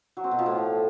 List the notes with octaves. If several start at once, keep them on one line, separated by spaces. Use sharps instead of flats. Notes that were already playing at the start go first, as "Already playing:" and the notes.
F#3
C4
B2
F3
A2